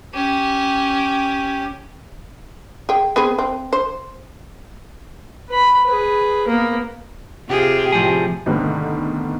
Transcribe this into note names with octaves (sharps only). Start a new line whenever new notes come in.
C#4 G4
G#4 G5
B3 C4 G#4
C4
C5
B4 B5
G#4 B4
A#3 B3
C3 F4 G4 G#4
A2 C3 F3 G#4
C2 G#2 D3 D#3 A3 B3